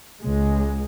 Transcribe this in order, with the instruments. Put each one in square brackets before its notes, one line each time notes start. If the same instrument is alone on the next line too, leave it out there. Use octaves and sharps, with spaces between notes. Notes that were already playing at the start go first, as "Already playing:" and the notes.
[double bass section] C#2 G#3